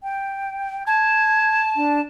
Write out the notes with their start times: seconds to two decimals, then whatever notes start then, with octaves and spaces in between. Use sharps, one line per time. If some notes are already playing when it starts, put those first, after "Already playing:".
0.03 G5
0.87 A5 G#6
1.76 D4